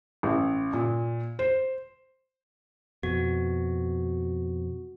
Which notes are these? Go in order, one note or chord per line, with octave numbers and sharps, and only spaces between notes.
A1
A#2
C5
F2 B2 F#4